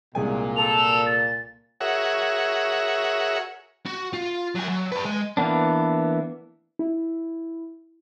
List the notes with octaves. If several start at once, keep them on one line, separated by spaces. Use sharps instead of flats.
C2 A#2 G#3 G#5
A4 F7
A6
F#4 G#4 A#4 C#5 E5 F#5
F#4
F4
F#3 G#5
F#3
B4 D5
G#3 D#5
E3 A#3 B3 D4
E4